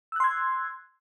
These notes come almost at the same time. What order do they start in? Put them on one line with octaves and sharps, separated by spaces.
E6 F#6 C6 G#6